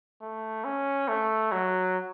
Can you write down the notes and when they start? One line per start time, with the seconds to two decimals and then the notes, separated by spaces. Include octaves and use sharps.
0.21 A3
0.64 C#4
1.08 A3
1.52 F#3